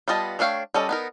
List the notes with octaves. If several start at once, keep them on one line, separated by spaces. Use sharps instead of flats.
G3 B3 F4 D#5 A5
A3 D4 C#5 F5 G5
G3 C#4 A4 D#5
B3 D#4 A#4